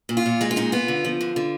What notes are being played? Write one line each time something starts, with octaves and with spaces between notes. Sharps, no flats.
A#2
F4
A#2
G#3 D#4
F4
A#2 D#4
B3 F4
D3
F3
D3
D3